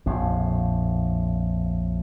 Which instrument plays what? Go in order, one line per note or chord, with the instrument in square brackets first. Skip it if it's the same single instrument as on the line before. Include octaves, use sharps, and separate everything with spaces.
[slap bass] A#1 F2 A2